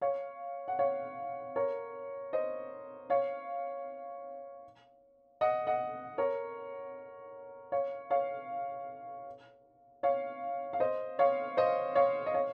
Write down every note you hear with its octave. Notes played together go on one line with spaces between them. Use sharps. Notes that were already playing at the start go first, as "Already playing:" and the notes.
C#5 F5
F#5
C#5 F5
A#4 C#5
C5 D#5
C#5 F5
D#5 F#5
D#5 F#5
A#4 C#5
C#5 F5
C#5 F5
C#5 F5
F5
C5 D#5
C#5 F5
C5 D#5
C#5 F5
D#5
C#5 F5